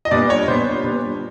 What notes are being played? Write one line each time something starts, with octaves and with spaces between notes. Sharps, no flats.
D#5
A#2 G3 B3 D4 D5
C#5
A#2 G3 B3 D4 C5
A#2 G3 B3 D4